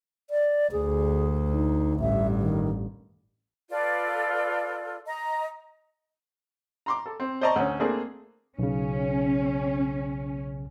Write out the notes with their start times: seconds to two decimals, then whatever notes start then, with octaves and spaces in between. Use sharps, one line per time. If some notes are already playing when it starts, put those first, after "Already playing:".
0.30 D5
0.72 D2 G#4
1.52 D#4
2.00 A1 G2 E5
2.38 D#3
3.70 F4 A4 B4 D5
5.07 D#5 A#5
6.86 A#5 C6 D6
7.06 A4
7.20 C4
7.41 C5 D5 D#5 A5 A#5 C#6
7.56 D2 C#4
7.80 A3 A#3 C4 D4 G#4
8.59 B1 C#3 C#4